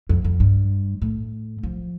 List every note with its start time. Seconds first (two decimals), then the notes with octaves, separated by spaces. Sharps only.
0.09 F2
0.24 F2
0.40 G2
1.02 A2
1.63 F3